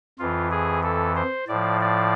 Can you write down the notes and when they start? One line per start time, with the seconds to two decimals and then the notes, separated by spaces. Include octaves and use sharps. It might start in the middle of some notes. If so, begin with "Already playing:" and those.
0.19 F2 E3 F4
0.51 G#4
0.83 A4
1.16 C5
1.48 A2 F3 D5
1.80 D5